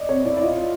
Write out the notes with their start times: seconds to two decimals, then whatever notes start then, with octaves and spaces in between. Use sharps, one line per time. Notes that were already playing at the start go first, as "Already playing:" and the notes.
Already playing: D5 D#5
0.09 C4 C#5
0.25 E4 D5
0.37 D5
0.42 F4 D#5